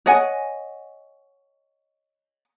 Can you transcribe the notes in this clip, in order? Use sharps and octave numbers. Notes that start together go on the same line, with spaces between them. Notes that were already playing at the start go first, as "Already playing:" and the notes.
C#5 D#5 F#5 G#5